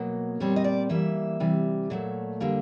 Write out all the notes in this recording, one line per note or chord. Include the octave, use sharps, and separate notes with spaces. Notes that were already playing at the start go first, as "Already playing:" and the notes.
Already playing: B2 F#3 A#3
A#2 G3 C4 C#5
D#5
D5
E3 G3 A#3 E5
C3 E3 G3
A#2 F#3 A3
D3 G3 A#3